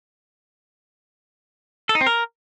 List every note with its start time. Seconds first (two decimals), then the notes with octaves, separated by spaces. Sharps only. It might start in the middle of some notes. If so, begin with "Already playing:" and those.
1.89 A4
1.95 D#4
2.01 C4
2.07 A#4